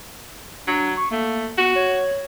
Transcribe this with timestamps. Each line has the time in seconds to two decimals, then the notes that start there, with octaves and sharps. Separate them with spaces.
0.67 F#3 D4
0.97 C#6
1.11 A3 A#3
1.58 B3 F#4
1.76 C#5